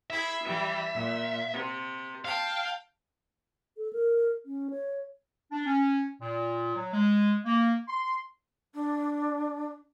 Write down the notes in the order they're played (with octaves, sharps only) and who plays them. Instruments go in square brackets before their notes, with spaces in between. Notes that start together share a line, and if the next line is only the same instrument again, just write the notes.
[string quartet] E4 G#4 B5 [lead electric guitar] E5
[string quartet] E3 G3
A#2
C3
[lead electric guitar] F5 [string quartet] G5 A5
[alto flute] A4
A#4
C#4
C#5
[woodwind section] D4
C#4
A#2
F#3
G#3
A#3
C6
[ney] D4